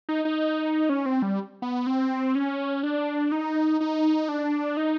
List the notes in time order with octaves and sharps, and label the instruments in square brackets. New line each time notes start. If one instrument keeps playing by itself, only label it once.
[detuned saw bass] D#4
D#4
C#4
C4
G3
B3
C4
C#4
D4
D#4
D#4
D4
D#4